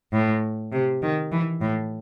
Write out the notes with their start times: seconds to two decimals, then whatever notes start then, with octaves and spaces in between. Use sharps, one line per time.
0.13 A2
0.72 C3
1.02 D#3
1.32 E3
1.62 A2